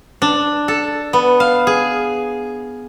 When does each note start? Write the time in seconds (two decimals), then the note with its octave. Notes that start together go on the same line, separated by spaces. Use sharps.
0.22 D4
0.68 A4
1.13 B3
1.40 F5
1.67 G#4